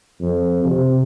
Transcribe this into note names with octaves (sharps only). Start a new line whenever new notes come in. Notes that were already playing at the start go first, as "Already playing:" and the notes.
F2
C3